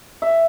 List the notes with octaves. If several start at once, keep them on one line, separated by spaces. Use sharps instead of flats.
E5